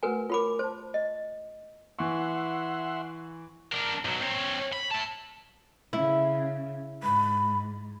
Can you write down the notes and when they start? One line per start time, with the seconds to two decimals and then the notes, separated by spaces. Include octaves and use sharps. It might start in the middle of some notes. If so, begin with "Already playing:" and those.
0.03 A3 F#4 A#4 B4 G#5
0.30 F4 A#4 C#5 B5 D6
0.59 C5 A5 C6
0.94 D#5
1.99 E3 E5 F#5 C6 C#6
3.72 D4 A#4
4.05 B1 F#3
4.20 C4 C#5
4.72 B5
4.91 E4 A5
5.93 C#3 E4
7.03 G#2 B5